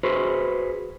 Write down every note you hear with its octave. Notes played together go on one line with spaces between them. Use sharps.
F#4 G#4 B4 C5